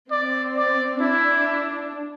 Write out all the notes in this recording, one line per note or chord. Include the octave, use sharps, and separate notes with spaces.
C4 D5
D5
D4 E4